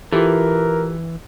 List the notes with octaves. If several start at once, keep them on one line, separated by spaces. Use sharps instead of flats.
E3 F4 G4 A4 A#4